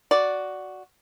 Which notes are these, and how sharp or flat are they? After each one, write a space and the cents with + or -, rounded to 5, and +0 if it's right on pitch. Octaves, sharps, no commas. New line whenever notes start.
F#4 +0 D5 -5